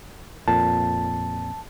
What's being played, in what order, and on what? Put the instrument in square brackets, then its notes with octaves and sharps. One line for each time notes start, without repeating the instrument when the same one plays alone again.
[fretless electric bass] F2 A#2 [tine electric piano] A5